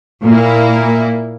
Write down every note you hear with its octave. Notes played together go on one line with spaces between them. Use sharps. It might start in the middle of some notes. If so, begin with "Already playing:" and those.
A#2 A#3 E4